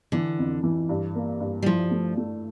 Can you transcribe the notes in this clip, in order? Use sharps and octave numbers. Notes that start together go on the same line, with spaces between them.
D3 E3
F2
E3
G2
A#3
G2
G3
F3 E4
A3
A3